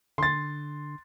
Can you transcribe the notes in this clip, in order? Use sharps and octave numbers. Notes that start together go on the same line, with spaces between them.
D3 C6 A6